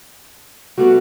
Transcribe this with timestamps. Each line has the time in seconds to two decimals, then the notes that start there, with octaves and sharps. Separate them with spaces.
0.78 G3 A3 B3 F#4